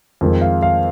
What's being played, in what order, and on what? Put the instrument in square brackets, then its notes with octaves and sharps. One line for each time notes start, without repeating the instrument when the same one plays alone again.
[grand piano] F2 D#3 G#3 C4
F5
F5